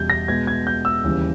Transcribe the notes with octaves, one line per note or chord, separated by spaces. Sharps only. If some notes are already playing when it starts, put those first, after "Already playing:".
Already playing: E2 B2 G3 C#4 G6
A#6
B2 G#3 B3 G#6
G#6
G6
E6
D#2 C#3 E3 G3